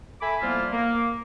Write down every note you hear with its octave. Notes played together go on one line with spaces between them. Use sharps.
A4 E5 G#5 B5 D6
F3 G3 A#3 B3 E4 F4
A#3